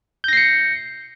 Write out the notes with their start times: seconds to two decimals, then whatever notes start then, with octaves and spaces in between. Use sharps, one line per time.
0.24 G6
0.28 A#6
0.33 C7
0.37 C#7